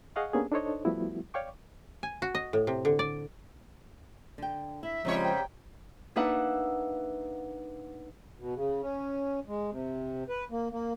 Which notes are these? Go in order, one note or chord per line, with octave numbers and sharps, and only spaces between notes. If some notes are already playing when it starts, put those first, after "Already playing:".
G#4 D#5 F5 F#5 C#6
A#3 B3 C#4 D4 G4 G#4
D4 D#4 A4 C5 C#5 D#5
F3 G3 A3 B3 E4 F#4
C#5 D5 F5 G5 C#6 D6
G#5
F#4
D#5
A2
C3
D3
D5
D3 G5
E4 E5
G#2 C#3 F3 G3 G#3 C4 G4 C#5
G5
A#3 D4 D#4 B4 E5 F#5
B2
C#3
C#4
G#3
C3
B4
A#3
A#3